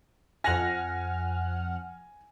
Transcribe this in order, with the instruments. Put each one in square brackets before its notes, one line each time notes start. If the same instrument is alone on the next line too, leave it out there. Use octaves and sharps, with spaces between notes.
[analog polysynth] F2 F#5 F6 [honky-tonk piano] G#5 A#6